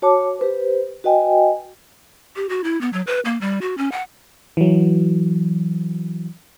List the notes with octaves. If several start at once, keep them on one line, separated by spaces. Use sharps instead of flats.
F#4 C#5 A5 D6
G4 B4 C5
F#4 B4 D#5 G5 G#5
G4
F#4
E4
B3
F#3
B4
A#3
G3
F#4
C#4
F#5
E3 F#3